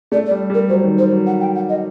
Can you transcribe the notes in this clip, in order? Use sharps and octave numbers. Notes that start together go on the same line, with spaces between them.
A3 D5
D5
G3
G3
A#4
F#3 C5
D#3
D#3 C5
F#3
F#5
G5
F#5
D#5